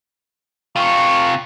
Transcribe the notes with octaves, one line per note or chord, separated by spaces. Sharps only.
C3 F4 C#6